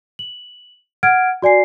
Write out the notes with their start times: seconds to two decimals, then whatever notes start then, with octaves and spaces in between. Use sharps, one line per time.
0.19 F#7
1.03 F#5 F6 G#6 D7
1.42 F#4 D5 G#5 C7